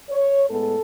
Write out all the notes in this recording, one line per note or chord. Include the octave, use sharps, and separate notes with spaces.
C#5
A2 G#3 B3 A4